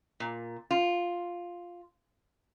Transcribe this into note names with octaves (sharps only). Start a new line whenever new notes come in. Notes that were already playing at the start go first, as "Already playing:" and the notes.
A#2
F4